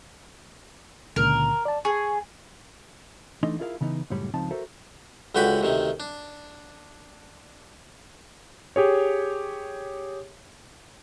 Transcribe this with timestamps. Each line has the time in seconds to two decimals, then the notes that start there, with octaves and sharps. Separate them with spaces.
1.16 C#2 A#2 D3 A#4
1.65 D5 A5
1.85 G#4 C#6
3.43 E3 A3 D4 D#4 D#5 C6
3.59 E4 F4 G#4 A#4 C#5 F5
3.81 C#3 E3 B3 D#4
4.10 C#2 F#2 A2 G3 C#5 B5
4.34 C#2 F3 C4 D#4 A5
4.51 F#4 A4 A#4 C5 E5
5.35 C#2 D3 F#4 B4 G5 B5
5.61 D2 C3 D#3
6.00 D4
8.76 G4 G#4 C#5